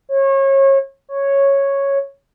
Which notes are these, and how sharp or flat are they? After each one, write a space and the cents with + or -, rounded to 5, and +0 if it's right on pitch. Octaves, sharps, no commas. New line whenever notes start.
C#5 -30
C#5 -5